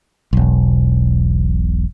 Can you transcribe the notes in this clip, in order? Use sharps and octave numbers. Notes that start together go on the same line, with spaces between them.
E1 B1